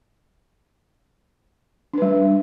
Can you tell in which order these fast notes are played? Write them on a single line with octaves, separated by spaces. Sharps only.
D4 B4 G3